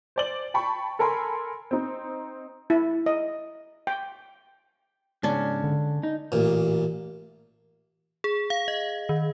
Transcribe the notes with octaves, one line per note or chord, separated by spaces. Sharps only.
C5 D5 F#7
G5 A5 B5 C#6
A4 A#4 G#5 B5 C6
C4 D#4
E4
D#5
G5
G#2 C#3 C#4 D4
D3
D#4
A1 A#2
G#4
F5
D#5
D#3